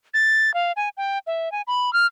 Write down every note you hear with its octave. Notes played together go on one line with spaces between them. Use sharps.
A6
F5
G#5
G5
E5
G#5
B5
F6